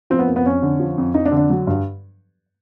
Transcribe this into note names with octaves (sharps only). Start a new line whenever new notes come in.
F3 C4
B3
F2 A#3
B3
F2 C#4
D3
F3
F2
F2 D#4
D4
D3
D4
F#3
G2